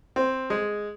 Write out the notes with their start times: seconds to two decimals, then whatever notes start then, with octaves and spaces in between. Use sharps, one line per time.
0.16 C4
0.50 G#3